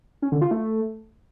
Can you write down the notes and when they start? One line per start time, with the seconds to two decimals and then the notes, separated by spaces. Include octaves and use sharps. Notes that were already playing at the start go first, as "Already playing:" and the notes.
0.22 C#4
0.32 D3
0.42 F4
0.51 A3